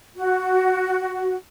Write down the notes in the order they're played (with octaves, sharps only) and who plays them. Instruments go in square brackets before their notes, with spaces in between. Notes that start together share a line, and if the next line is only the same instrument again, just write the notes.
[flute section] F#4